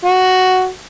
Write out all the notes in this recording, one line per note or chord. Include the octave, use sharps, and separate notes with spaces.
F#4